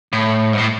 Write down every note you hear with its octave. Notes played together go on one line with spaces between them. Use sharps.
A2
G#2
A2